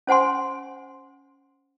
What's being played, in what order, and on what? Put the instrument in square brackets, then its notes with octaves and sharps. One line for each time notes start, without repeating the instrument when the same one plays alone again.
[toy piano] C#4 C5 F#5 G#5 C6